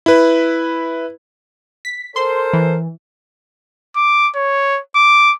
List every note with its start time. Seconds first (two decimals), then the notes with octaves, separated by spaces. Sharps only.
0.06 E4 B4
1.85 B6
2.16 A4 A#4 C5 C6
2.53 E3
3.96 D6
4.36 C#5
4.95 D6